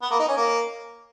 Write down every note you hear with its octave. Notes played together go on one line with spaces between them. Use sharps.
B3
A#3
D#4
C#4
A#3